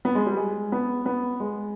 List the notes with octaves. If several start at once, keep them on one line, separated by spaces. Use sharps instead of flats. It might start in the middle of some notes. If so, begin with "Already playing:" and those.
B3
G#3
G3
G#3
B3
B3
G#3